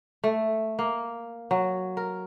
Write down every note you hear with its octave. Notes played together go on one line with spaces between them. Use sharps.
A3
A#3
F#3
A#4